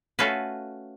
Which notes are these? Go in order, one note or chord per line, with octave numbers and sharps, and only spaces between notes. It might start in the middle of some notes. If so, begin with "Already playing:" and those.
A3 C#4 F4 F#4 B4